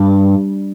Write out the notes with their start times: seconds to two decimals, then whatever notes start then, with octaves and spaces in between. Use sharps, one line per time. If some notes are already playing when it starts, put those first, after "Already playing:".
Already playing: G2